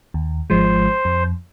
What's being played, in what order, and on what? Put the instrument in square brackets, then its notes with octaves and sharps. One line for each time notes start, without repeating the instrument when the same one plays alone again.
[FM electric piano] D#2
[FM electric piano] G#1 F3 G#3 [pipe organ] C5
[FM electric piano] F2